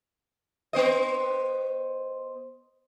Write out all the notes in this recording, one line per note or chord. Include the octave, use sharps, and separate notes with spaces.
B3 C5 D#5